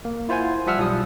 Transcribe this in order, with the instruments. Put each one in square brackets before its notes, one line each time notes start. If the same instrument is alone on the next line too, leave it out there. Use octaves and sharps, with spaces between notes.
[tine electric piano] A#3
E4 F4 C5 F#5 G#5
F3 G3 E5 F#5 E6 F6
B1 F3 G3 D#6